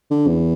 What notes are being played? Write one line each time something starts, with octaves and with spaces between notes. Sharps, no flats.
D3
E2